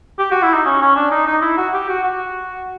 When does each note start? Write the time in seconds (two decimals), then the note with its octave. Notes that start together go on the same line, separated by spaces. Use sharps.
0.19 G4
0.31 F#4
0.43 E4
0.53 D#4
0.65 C#4
0.81 C#4
0.96 D4
1.11 D#4
1.27 D#4
1.42 E4
1.57 F#4
1.73 G4
1.89 F#4
2.03 F#4